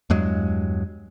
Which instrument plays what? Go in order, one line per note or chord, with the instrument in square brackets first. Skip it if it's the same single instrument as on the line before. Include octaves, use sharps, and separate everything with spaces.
[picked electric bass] E2 G2 F#3 G#3